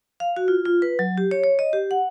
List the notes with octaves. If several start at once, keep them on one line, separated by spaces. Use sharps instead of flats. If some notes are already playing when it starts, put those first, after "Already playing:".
F5
F#4
F4
F4
B4
F#3
G4
C#5
C#5
D#5
G4
F#5